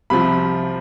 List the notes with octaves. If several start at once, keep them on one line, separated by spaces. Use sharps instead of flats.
C2 C3 F3 B5